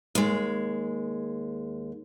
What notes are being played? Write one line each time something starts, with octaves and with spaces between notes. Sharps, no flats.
D#2 G#3